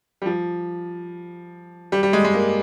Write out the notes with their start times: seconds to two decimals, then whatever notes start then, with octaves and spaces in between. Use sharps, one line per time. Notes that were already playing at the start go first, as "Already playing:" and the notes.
0.22 G3
0.26 F3
1.92 G3
2.03 G3
2.13 G#3
2.24 G#3
2.34 A#3